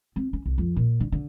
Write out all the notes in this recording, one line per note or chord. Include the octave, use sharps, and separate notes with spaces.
C4
C#4
C2
F2
A#2
D3
D3